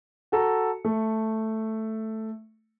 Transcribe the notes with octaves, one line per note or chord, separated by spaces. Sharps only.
F#4 A4 A#5
A3